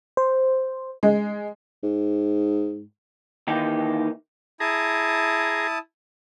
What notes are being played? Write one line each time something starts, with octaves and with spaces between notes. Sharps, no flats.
C5
G#3
G#2
D#2 D#3 E3 D#4 G4
E4 G#4 A5 A#5 D#6